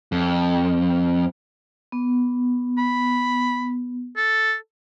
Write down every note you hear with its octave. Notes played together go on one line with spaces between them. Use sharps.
F2
B3
B5
A4